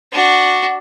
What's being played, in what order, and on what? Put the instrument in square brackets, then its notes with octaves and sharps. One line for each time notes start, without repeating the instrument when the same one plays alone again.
[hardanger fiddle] D4 F#4